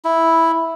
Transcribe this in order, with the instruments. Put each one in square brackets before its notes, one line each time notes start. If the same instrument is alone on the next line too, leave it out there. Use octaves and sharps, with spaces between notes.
[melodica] E4